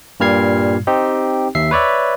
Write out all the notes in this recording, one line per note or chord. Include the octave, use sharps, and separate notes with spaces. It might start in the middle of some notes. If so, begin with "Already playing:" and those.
G2 A#2 G3 F6 G#6 C7
C4 D#4 G4
D#2 E5 C7
B4 C#5 D5 E5